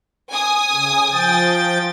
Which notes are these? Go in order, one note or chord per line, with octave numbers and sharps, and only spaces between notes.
G#5 D#6
C#3
F3 G5 A6